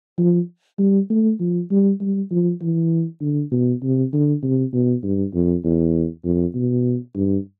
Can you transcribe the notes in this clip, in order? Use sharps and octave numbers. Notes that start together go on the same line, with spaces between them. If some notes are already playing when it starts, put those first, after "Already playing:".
F3
G3
A3
F3
G3
G3
F3
E3
D3
B2
C3
D3
C3
B2
G2
F2
E2
F2
B2
G2